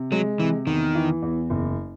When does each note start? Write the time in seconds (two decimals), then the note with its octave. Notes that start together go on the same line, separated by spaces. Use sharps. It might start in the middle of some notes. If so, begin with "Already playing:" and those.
Already playing: C3
0.12 F#3 G#3
0.39 C3 E3
0.67 E2 D#3
0.95 E3
1.22 E2
1.50 F#1